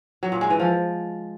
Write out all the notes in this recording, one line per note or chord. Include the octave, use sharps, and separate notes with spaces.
F#3
A#2
G#3
E3
F3